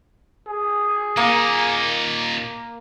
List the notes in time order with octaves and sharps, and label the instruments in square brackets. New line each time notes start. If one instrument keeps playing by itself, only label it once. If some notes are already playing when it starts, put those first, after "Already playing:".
[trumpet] G#4
[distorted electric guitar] A#2 D#4 [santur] A#3